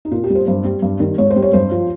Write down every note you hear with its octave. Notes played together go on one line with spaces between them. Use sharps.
D#4
A#2 F4
G4
G3
C5
G2 C5
G3
G2
D#3 G3
G#2 C#5
C5
G3
C#5
G2 C5
F3